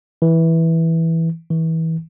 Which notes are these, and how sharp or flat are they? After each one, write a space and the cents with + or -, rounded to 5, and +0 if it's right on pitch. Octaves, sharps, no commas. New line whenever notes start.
E3 -10
E3 -30